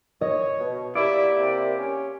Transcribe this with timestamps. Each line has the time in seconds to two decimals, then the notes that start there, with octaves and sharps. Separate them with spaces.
0.21 C#5 D#5
0.60 B2
0.95 A#3 E4 G4 D5
1.38 C3
1.79 C#4